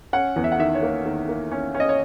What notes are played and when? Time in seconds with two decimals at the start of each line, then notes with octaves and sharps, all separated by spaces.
0.13 C#4 F#5
0.36 E2
0.44 E5
0.52 F#5
0.59 D#3 E5
0.75 C#5
0.82 A#3
1.06 D#3
1.28 A#3
1.51 C#4
1.74 C#4
1.80 D#5
1.89 C#5